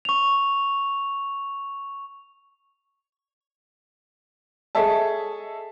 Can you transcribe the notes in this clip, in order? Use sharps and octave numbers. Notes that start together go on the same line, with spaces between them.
C#6 F7
G#4 A4 C#5 D#5 E5 A5